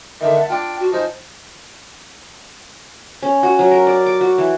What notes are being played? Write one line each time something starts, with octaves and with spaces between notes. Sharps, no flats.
D3 D#3 E5
F#5 A5
D4 F4 G5
F#4
F3 D#4 C5 G#5
C#4
F#4
F#3
A#4
D5
D6
F#4
E3